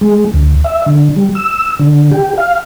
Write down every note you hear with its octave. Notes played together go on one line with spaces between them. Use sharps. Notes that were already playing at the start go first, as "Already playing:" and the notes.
G#3
D2
E5
D3
G3
E6
D3
G4
F5